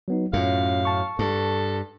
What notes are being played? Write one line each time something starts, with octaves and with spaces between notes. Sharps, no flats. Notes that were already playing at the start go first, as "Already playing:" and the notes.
F#3 B3 D#4
F#2 A2 C#4 F4 F5
A5 C#6
G2 A4